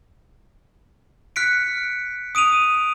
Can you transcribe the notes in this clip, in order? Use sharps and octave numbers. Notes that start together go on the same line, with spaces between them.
F6 F#6 B6 C#7 D7
D#6 D7 D#7 F7